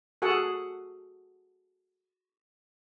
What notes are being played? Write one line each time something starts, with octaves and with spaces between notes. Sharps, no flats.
F#4 G#4 A4 F#5